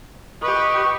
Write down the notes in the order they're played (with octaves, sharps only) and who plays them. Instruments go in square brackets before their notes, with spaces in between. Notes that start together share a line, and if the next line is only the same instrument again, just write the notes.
[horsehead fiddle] G4 B4 [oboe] D#5 [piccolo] C#6